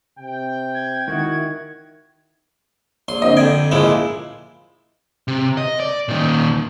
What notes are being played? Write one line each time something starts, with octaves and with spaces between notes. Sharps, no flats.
C3 G5
G#6
D#3 E4 F#4
A#1 C6
D3 C4 D#5
F2 D3 G5 G#6
F#1 A#2 F3 G#3 E4 E7
C3
D#5
D5
A#2 D#3